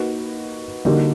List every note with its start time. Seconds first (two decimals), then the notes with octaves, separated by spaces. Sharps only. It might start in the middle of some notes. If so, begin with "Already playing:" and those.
Already playing: A#3 D#4 F#4 B4
0.85 D3 G3 A#3 D#4 F#4